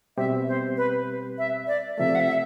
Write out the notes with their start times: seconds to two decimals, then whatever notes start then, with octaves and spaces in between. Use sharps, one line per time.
0.17 B2 G3 C4 G4 E5
0.48 C5
0.77 B4
1.38 E5
1.67 D5
1.98 C3 F3 A3 E5
2.15 F#5
2.20 E5